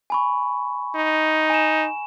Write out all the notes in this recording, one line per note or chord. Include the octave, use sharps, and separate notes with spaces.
G#5 B5 C#6
D#4
G#5 E7